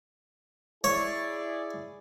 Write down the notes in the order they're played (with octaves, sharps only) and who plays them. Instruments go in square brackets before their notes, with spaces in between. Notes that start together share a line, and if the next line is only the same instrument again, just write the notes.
[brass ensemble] E4 G#4 D5 [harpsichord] C#5